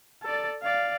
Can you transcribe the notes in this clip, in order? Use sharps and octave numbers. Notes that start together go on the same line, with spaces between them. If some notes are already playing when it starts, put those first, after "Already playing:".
A4 D5
D5 F5